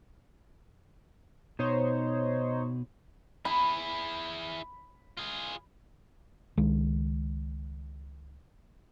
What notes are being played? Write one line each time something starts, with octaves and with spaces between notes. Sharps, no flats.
B2 D#4 C5 C#5
E4 G#4 B5
F4 G#4
C#2 D#3 G#3